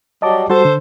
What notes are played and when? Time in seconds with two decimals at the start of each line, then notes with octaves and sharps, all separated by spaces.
0.22 F#3 G3 D#5 A5 D6
0.50 G3 F#4 A4 C5 A5
0.65 D3